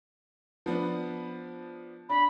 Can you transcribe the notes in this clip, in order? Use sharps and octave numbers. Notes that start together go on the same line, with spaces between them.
F3 B3 D4
D4 B5